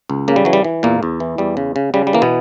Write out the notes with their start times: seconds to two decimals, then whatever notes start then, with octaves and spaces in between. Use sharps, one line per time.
0.10 C#2
0.28 C#3 A#3
0.36 G3
0.45 E3 F#3
0.53 G3
0.64 E3
0.83 E2 A#2 A#3
1.03 E2
1.20 E3
1.38 E2 G3
1.57 C#3
1.76 C#3
1.94 C#3 G3
2.07 G3
2.13 E3 A#3
2.22 B2 B3